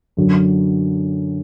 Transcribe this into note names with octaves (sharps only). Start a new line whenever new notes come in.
F#2 D3 F#3